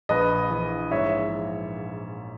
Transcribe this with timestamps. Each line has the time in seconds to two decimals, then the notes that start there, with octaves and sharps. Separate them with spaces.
0.09 A#1 B4 D#5
0.50 E3
0.91 G#2 C#5 E5